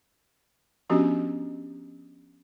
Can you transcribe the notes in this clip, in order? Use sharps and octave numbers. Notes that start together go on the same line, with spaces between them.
F3 B3 C#4 D4 F#4 G4